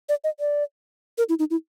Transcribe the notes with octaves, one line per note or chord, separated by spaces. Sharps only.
D5
D#5
D5
A#4
E4
D#4
E4